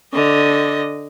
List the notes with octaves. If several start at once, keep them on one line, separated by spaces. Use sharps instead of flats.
D3 D#5